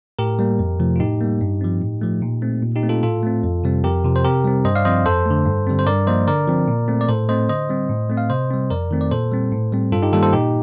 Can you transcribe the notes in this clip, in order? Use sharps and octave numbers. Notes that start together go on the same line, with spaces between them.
A2 G4 A#4
G3 A#3
F2
C3 F3 A3
F4
A2 D#4 G4
G3 A#3
G2
F3 C4
A2
F3 A3
A#2
A3 C4
A#2
D#4 G4
A3 C4
F4 A4
A2 F4 A4
A3 C4
F2
C3 G3 C4
F2 G4 A#4
C3 F3
C5
C3 G4 A#4
G3 C4
G2 C5 D#5
D5 F5
F3 C4 C5 D#5
F2 A4 C5
D3 A3
G2
D3 G3 C4
C5
G2 A#4 D5
F3 A#3 C5 D#5
D3 A#4 D5
F3 C4
A#2
A3 C4
D5
A2 A4 C5
A3 C4 C5 D#5
D3 C5 D#5
G3 C4
A2
A3 C4
F5
C3 C5 D#5
G3 C4
F2 A#4 D5
D#3 A3 C4
D5
A#2 A4 C5
G3 C4
A2
G3 C4
G2 F4 A4
D#4 G4
D#3 G3 A#3 F4 A4
A4 C5
A#2 D#4 G4